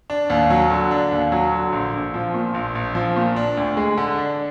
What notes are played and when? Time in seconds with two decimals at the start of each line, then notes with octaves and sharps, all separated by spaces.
0.10 D4
0.30 D#2
0.50 F#3
0.70 D3
0.91 D4
1.11 D#2
1.32 F#3
1.52 D3
1.72 A#1
1.94 A#1
2.14 F3
2.34 A#2
2.54 A#1
2.75 A#1
2.95 F3
3.16 A#2
3.36 D4
3.57 D2
3.77 G#3
3.98 D3
4.18 D4